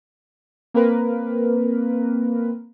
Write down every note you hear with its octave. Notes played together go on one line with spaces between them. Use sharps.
A#3 C4 A#4 B4